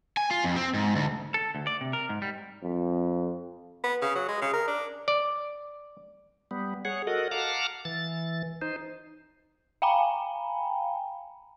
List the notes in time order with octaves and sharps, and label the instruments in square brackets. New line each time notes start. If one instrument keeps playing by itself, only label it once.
[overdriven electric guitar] G#5
F4
F2
C4
G#2
D2
[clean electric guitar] A4
D2
D5
C3
A#4
G#2
G3
[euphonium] F2
[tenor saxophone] B3
C#3
F#3
G#3
C#3
A#4
D4
[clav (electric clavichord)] D5
[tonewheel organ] G3 B3
G#4 C#5 F#5
F#4 A4 A#4 D#5 F#5
F5 F#5 A5 A#5 D6 F6
E3 A6
D#4 C5
[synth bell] F5 G5 G#5 A#5 B5